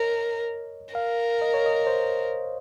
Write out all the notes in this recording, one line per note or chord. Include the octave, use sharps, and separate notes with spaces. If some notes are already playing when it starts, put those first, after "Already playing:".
Already playing: A#4 C#5 D#5
A#4 F5
D#5
C#5
D#5
C5